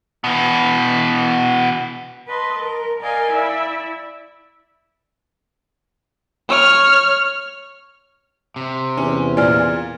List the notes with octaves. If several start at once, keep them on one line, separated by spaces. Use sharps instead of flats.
B2 E3
B4 D#5 A5 C6
A#4
A#4 D5 D#5 F5 G#5
E4 D5 E5
C#5 F6
C3
E2 C#4
A#2 D5 G#5 F6